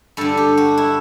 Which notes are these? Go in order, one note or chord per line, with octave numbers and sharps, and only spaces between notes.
G2 D3 A4
G4
F#4
E4